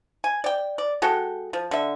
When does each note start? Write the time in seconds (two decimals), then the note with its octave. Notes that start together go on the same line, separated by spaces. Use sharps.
0.24 G#5
0.44 D5 G5
0.78 D5
1.02 G#3 F#4 A4 G5
1.53 F3
1.71 D3 E5